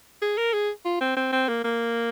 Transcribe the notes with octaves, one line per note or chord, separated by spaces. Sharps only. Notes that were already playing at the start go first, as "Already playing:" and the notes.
G#4
A#4
G#4
F4
C4
C4
C4
A#3
A#3